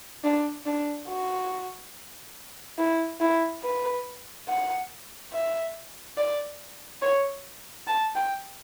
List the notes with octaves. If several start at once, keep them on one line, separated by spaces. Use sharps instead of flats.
D4
D4
F#4
E4
E4
B4
F#5
E5
D5
C#5
A5
G5